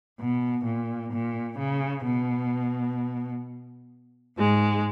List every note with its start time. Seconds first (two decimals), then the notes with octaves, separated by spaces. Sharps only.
0.20 B2
0.65 A#2
1.12 A#2
1.59 C#3
2.05 B2
4.38 G#2 G#3